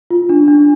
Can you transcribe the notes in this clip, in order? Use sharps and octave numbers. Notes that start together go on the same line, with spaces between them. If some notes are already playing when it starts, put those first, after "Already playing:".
F4
D4
D4